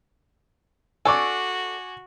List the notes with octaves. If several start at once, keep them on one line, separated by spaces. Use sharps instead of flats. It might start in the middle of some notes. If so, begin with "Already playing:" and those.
D4 F#4 A4 G#5 C#6 D6